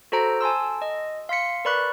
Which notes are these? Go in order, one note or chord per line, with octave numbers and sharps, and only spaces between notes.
F#4 A4 C5 A#5 D7
G#5 A5 C6 E6
D#5
F5 C6 B6 C#7
A#4 B4 D5 B5 C#6 F#6